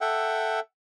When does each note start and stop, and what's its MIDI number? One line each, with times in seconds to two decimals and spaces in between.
0.01 0.60 69
0.01 0.60 76
0.01 0.60 78
0.01 0.60 79